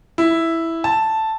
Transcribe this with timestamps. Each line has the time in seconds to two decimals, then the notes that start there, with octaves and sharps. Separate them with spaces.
0.18 E4
0.84 A5